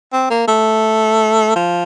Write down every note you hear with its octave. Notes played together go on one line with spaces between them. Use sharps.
C4
A#3
A3
F3